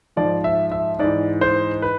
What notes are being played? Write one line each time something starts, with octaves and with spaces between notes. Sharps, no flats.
G#2 F3 D5
E5
E5
G#2 E3 D5
C5
B4